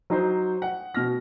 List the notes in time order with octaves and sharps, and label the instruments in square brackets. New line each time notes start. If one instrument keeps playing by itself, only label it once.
[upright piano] F#3 D#4 C5
F#5
B2 F6 A#6